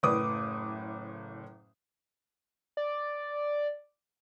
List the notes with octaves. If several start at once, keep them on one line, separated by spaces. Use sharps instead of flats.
F#1 A2 B4 D6 D#6
D5